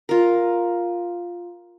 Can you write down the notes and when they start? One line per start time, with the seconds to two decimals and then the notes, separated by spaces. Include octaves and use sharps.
0.09 F4 A#4